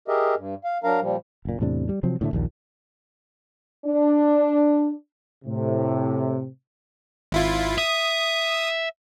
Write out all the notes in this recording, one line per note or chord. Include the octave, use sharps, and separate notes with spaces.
G4 G#4 A#4 D#5 E5
G2
F5
F#3 D4 A#4 F5 A#5
A#2 F3 G3
F#1 A#2
E2 A2 C3 D4
G3
C3 F3 F#3 C4
A2 D3 G#3 A3
A#1 D#2 A#2
D4
A2 C3
G#1 E4 F4
E5 D#6